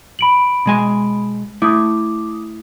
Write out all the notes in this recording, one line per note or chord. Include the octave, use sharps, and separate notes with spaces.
B5 D7 F#7
B2 G#3 G#5
A3 E4 D6 D#6